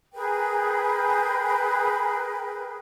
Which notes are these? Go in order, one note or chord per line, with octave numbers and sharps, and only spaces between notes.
G#4 A#4 B4 G5